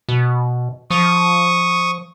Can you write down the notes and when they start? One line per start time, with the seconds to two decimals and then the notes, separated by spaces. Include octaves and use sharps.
0.09 B2
0.90 F3 C#6 D#6